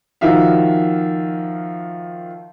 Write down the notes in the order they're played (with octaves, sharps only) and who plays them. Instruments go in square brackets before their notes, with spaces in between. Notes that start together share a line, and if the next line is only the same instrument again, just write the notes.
[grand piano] D#3 F3 F#4 E5 F5